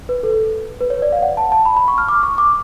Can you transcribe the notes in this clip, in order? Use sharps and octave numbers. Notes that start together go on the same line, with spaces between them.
B4
A4
B4
C#5
D5
F5
F#5
A5
A5
B5
B5
C#6
F6
D6
C#6
D6